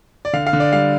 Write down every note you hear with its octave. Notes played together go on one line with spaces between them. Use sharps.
D5
D3 F5
F5
D3
D5
G3 F5